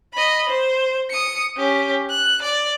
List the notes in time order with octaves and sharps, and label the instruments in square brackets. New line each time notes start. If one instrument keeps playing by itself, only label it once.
[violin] D#5 B5
C5
D#6 C#7
C#4 G4
F#6
D5